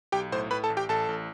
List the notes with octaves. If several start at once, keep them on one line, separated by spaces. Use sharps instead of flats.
B1 G4 G5
A2 C5 C6
A2 B4 B5
A4 A5
A1
G4 G5
A1 A4 A5
A1